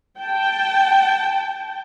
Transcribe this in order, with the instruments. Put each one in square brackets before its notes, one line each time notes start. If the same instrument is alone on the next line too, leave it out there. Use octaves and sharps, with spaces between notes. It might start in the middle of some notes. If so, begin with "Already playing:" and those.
[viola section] G5 A5